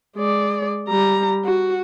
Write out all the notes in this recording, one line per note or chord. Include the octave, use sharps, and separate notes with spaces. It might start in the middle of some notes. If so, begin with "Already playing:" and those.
G#3 D5
G3 A#5
F#4